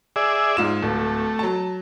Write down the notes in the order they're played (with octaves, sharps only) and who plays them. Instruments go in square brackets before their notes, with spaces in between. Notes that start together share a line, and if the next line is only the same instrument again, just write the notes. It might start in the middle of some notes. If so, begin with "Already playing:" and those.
[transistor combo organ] G#4 D5 E5
[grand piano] G#2 F4 E7
[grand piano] D1 [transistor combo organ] A3
[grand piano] F#3 A5